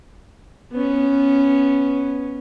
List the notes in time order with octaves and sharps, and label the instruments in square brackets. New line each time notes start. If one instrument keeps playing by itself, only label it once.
[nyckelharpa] B3 C#4